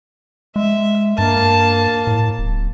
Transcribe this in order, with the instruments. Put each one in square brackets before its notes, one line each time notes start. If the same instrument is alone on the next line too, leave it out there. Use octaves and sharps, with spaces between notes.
[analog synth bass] G#3 [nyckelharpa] E5
[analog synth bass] G2 [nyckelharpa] A#3 A5
[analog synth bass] A2
D1